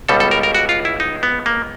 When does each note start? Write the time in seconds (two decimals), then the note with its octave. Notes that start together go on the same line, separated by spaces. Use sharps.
0.09 C#2 B2 G3 A4
0.20 A4
0.31 A#4
0.43 A#4
0.55 F#4
0.69 F4
0.85 E4
1.00 D#4
1.23 B3
1.46 A#3